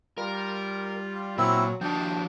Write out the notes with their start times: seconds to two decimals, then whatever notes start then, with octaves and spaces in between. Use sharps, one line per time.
0.18 G3 F4 A#4
1.38 A#2 F#3 C4 E4 E5
1.81 D#2 F3 D4 F#4 G5 A5